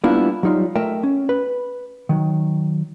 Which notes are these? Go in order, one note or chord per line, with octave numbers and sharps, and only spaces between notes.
G3 A#3 B3 D4 E4 F4
F#3 G3 D#4 F4
A3 A#4 D#5 E5 G5
C#4
B4
D#3 F#3